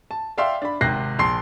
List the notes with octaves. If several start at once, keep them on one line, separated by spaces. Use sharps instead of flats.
A5
D5 E5 F5 G5 C6
D4 B5
G#1 C3 G5 F#6 A#6 C7
A#1 C6 C7